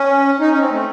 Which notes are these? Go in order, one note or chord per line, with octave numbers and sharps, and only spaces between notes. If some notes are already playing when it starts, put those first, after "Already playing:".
Already playing: C#4
D#4
C#4
C4
A3